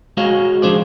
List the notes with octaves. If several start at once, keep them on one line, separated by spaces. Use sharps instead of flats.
G#3 F#4 G#4 C#5 D#5 F5
F3 D4 G#4 C5 D5